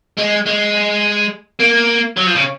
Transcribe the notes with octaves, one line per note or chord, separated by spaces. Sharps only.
G#3
G#3
A#3
F#3
F3
C#3